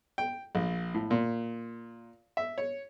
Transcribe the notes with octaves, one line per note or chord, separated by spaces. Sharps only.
G5
A#1
A2
A#2
E5
C#5